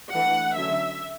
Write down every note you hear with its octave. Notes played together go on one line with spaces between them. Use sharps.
E3 A3 D4 F#5
D3 F#3 C#4 E5